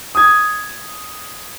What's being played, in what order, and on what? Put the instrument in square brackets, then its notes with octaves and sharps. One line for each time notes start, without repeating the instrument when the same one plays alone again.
[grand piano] D#6 G#6